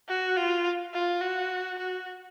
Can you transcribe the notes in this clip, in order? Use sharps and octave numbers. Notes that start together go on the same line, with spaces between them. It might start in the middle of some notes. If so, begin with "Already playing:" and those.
F#4
F4
F4
F#4
F#4